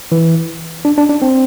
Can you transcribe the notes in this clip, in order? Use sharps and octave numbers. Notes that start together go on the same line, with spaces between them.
E3
D4
D4
D4
C4